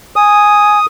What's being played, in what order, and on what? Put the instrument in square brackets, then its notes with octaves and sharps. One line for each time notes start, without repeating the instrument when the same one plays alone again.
[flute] G#5 [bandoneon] D#6